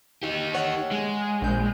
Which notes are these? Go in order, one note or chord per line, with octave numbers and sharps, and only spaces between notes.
D#4 G4
C#5 F#5
G#3
A#1 G6